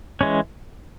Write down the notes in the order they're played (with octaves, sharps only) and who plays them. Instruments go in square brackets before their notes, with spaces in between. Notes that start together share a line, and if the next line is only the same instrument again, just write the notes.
[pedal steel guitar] E3 G#3 C#4